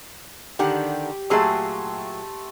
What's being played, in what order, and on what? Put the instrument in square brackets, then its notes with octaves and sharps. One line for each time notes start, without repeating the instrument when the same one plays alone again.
[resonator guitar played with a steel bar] D3 D#3 F#5 [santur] G4
[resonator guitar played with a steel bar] A#2 F#3 G#4 [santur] A3 C6 E6